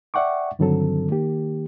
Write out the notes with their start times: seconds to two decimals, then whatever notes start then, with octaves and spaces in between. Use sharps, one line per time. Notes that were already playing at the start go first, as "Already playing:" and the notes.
0.14 D5 E5 F#5 G5 C#6 D6
0.59 G2 D3 D#3 F#3 C4 A4
1.10 D#3 A#3 G4